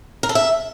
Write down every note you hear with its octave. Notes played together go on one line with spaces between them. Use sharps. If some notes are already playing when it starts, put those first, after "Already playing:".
A#4
A4
E5